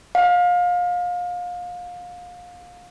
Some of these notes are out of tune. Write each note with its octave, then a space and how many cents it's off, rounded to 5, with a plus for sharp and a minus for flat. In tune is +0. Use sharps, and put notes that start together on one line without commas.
F5 +30